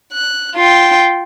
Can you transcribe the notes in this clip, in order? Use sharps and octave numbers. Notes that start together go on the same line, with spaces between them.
F#6
F4 G5